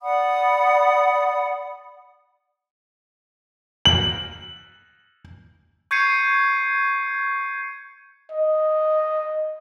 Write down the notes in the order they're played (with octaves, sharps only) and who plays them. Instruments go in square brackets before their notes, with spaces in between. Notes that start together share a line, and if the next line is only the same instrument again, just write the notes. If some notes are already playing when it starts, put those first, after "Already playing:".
[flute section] D5 F#5 B5 D#6
[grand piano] F#7
[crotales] C#6 G6 G#6 C7 C#7 D#7
[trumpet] D#5